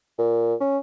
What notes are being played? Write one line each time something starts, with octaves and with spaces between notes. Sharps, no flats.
A#2
C#4